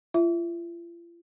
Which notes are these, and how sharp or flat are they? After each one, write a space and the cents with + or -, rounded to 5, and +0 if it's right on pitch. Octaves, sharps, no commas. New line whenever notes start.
F4 -40 E5 +0